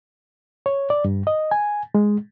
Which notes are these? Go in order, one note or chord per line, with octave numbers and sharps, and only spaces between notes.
C#5
D5
G2
D#5
G#5
G#3